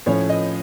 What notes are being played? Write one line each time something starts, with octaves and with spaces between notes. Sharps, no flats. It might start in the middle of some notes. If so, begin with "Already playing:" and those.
A2 F3 A3 C#4 C#5
D#5